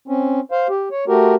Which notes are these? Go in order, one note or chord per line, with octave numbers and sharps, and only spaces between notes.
C4 C#4
C5 F5
G4
C#5
A3 F#4 G4 A#4